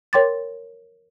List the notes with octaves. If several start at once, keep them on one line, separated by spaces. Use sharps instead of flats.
A#4 C#5 G5 C6 D6 A6